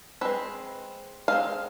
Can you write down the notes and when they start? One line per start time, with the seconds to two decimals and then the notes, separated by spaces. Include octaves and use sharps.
0.21 G#3 C4 B4
1.28 G#3 C4 F5